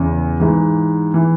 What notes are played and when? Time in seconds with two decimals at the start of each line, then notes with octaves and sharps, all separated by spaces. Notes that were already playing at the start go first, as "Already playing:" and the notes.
Already playing: E2 C#3 E3
0.40 G#2 E3
1.14 E3